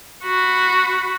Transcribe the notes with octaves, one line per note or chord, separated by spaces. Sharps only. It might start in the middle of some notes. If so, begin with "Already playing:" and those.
F#4 B5